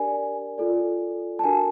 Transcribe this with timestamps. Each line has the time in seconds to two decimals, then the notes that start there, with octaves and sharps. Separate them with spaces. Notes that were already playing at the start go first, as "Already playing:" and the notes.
Already playing: D4 G4 A#4 D5 G#5
0.58 F4 A4 D5
1.39 A5
1.44 D4 F#4 A#4 G#5